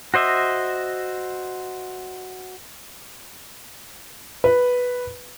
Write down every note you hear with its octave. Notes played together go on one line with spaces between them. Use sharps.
F#4 C5 D#5 E5
B4